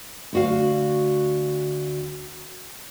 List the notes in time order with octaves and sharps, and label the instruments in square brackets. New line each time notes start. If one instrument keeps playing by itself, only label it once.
[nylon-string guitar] D2 F#4 F5